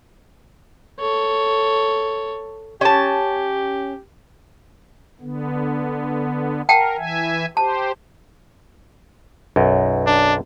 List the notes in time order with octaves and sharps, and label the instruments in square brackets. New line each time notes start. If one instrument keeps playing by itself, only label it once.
[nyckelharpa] A4 C#5
[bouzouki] C#4 A5 [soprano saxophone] G4
[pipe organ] D3 B3
[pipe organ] A#4 [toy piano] F#5 G5 A5
[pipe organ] E3 E5 G#5
[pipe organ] G4 C5 [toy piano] A5
[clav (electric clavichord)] B1 F#2
[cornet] D4